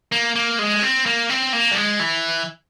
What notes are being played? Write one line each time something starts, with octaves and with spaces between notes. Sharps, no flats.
A#3
A#3
G#3
C4
A#3
C4
A#3
G3
G#3
E3